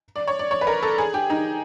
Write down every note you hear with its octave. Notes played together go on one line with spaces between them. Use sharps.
D5
C#5
D5
C#5
B4
A#4
A4
G#4
G4
D#4